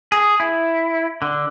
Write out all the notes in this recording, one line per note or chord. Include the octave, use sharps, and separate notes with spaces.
G#4
E4
D3